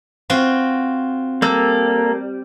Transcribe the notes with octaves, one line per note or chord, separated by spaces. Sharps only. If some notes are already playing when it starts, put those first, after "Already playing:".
C4 F4 F#4
G3 A#3 A4 E6